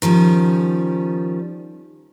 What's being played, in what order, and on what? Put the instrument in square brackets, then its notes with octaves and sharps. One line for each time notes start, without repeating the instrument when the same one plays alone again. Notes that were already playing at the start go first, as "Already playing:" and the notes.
[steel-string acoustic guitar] D#3 F3 G3 C#4